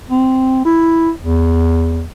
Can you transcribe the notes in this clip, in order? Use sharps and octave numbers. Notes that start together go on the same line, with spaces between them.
C4
E4
E2